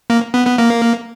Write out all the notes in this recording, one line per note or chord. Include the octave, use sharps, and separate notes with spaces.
A#3
B3
B3
A#3